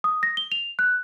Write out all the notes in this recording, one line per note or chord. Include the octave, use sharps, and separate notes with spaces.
D#6
A#6
G7
F7
F#6